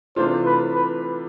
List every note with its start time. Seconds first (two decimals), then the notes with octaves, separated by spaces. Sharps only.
0.16 C3 E3 A3 D4 F4 C5
0.46 B4
0.75 B4